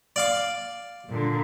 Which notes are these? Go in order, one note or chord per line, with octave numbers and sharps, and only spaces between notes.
D5 F5 D6
A#2 D3